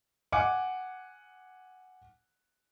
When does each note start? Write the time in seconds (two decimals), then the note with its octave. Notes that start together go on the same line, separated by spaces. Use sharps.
0.32 F#5 G#5 D6